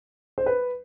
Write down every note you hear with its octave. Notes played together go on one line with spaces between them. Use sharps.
C5
B4